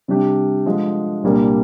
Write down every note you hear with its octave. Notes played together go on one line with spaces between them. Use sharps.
C3 G3 D4 G4
D3 F3 G#3
C2 A#2 G3 A#3 D4